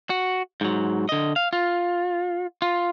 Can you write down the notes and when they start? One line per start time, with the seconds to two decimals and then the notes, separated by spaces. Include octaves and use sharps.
0.10 F#4
0.61 G#2 F#3
1.09 D3 D#5
1.36 F5
1.53 F4
2.62 F4